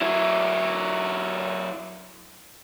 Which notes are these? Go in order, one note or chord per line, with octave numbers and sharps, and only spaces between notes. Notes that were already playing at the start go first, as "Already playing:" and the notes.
F#3 E4